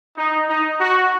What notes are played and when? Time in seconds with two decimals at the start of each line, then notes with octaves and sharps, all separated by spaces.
0.17 D#4
0.48 D#4
0.80 F#4